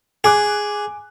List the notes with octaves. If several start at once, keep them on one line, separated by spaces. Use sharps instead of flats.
G#4 G#5 D6 F#6